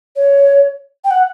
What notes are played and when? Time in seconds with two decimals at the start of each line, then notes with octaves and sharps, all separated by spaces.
0.16 C#5
1.04 G5
1.10 F#5